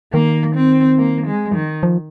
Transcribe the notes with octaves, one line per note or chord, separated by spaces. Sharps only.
D#3 A#3
C4
A#3
G#3
D#3
F3